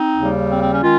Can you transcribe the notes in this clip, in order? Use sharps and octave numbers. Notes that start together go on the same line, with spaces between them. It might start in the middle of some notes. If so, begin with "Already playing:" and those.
Already playing: C4 D#4
D#2 C#3 G3
C4
C4
C#4
D#3 G#3 C#4 F4